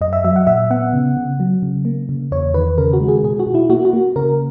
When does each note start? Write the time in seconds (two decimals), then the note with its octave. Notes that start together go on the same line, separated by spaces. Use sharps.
0.01 F#2 D#5
0.13 E5
0.24 F#3 E5
0.36 F#5
0.47 A#2 E5
0.70 B3 F#5
0.93 C#3
1.17 C#3
1.40 F#3
1.62 C#3
1.85 A#3
2.09 C#3
2.31 E2 C#5
2.54 D#3 B4
2.77 C#3 A#4
2.93 F#4
3.01 G#3
3.08 G#4
3.23 B2 G#4
3.39 F#4
3.47 B2
3.54 E4
3.70 A#3 F#4
3.85 F#4
3.93 A#3
4.16 C#3 A#4